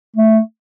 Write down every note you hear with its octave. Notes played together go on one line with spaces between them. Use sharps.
A3